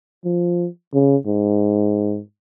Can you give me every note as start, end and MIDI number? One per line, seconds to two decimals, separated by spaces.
0.25 0.67 53
0.94 1.16 49
1.26 2.20 44